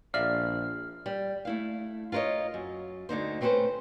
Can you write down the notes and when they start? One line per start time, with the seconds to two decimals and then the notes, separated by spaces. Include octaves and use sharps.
0.14 A#1 D5 E5 F5 F6
1.06 G3
1.45 A3 E4 F5
2.12 F4 A#4 B4 C#5 D#5
2.54 F#2
3.09 D2 D3 D#4 C5
3.41 A3 C4 C#4 A4 B4 C5